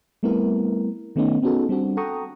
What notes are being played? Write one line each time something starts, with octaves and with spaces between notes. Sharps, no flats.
G3 A3 B3 C4 E4 A#4
D#3 A3 B3 C#4 D#4
B3 C#4 D#4 F#4 G#4 A4
G3 C4 D4 F#4
A4 F#5 G5 A#5 C#6 D#6